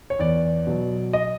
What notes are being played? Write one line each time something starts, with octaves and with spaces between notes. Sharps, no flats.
C#5
E2 D5
B2 F#3
D#5